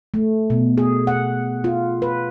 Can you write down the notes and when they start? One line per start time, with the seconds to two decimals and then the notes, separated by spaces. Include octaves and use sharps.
0.14 A3
0.50 B2
0.78 G#4
1.07 F#5
1.64 F4
2.02 B4